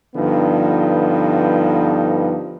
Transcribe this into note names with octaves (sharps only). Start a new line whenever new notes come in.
G2 D3 F3 B3 D#4